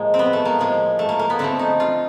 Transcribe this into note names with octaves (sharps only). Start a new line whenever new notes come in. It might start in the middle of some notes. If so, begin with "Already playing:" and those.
Already playing: A2 F3 G#3 A#3
C4
B3
A3
A#3
A2 F3 G#3
A3
A#3
A#3
B3
D3 F3 A3 C4
D#4
F4